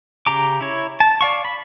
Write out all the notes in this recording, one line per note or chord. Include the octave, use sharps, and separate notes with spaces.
C#3 G4 A#5 D6
E4 C#5
A5
D5 F5 C#6
B5